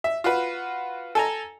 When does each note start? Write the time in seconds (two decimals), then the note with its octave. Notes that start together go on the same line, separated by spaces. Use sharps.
0.04 E5
0.24 F4 F#4 B4
1.15 A4 G#5 A#5